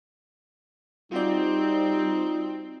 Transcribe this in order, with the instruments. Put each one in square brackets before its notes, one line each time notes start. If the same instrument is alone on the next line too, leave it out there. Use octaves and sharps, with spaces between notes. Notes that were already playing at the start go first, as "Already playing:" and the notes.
[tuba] G3 [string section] C4 [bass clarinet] D#4 [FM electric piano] F4 F#4 D5